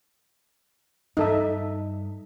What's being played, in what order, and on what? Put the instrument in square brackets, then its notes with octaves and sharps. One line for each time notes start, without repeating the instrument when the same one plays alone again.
[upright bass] G2 [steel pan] D#4 A4 E5